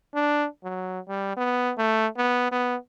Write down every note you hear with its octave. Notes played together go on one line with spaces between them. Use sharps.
D4
F#3
G3
B3
A3
B3
B3